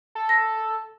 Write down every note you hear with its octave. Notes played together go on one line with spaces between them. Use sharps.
A4
A#6